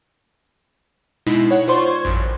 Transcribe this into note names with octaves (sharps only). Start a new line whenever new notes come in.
B2 G#3 D#4 E4
C#5 F#5
F4 C5 D5 C6 C#6
C5 G#6
A1 F#2